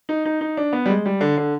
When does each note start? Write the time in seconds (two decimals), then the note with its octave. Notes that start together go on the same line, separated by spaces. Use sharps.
0.09 D#4
0.26 D#4
0.41 D#4
0.57 D4
0.73 B3
0.86 G3
0.90 G#3
1.06 G3
1.21 D3
1.37 D3